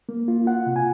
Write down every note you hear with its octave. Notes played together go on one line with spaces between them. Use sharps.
A#3
F4
F4 F#5
C3
G#5